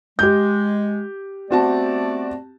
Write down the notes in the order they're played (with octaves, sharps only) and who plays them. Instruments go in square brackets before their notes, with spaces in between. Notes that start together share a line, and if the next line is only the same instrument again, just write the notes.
[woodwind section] G#3 [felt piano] G4 G6
[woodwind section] A3 B3 D5 [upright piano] C4 F#4 A5